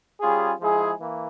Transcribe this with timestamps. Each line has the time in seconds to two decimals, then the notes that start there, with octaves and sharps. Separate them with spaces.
0.20 G3 C#4 F4 G#4
0.59 F3 G#3 E4 G#4
0.99 E3 A#3